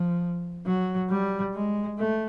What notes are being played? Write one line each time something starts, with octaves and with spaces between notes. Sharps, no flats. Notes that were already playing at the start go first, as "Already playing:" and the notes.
Already playing: F3
F#3
G3
G#3
A3